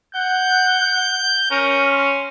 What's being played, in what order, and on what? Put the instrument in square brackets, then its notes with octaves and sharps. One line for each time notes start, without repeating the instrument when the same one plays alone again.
[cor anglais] F#5 [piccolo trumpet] G6
[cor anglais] C#4 [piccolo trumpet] A#4
[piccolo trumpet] C6